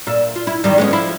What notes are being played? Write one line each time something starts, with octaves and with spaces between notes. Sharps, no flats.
A#2 E5
F4
E4
E2 D#3 G3
G#3 B3 C#4
F3 E4